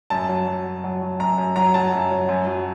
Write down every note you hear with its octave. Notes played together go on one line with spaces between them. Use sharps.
F#2 A5
F#3
F#3
F#2
F#3
F#3
F#2 A#5
F#2
F#3 A#5
F#3 A5
F#2
F#3
F#2
F#3